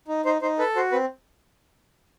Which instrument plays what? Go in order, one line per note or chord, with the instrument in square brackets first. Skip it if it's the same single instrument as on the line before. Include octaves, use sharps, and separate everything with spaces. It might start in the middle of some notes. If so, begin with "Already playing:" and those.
[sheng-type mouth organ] D#4
D#4 C5
D#4 C5
A4 B4
F#4 C5
C4 B4